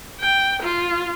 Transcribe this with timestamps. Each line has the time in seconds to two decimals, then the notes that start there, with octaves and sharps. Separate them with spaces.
0.20 G5
0.63 F4